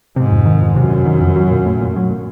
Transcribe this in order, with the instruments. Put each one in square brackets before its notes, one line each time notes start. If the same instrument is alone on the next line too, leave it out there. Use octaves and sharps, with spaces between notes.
[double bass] G#2 [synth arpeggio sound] C3
[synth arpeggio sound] F2
D#3
F2
[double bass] F#2 [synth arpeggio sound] C3
[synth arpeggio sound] F2
D#3
F2
F#3
A#2
A3
A#2
F#3
A#2